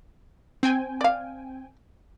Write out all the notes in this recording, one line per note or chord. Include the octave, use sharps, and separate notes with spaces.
C4 G5 G#5
D5 F5